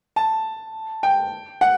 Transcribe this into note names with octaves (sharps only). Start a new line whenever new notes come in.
A5
G5
F#5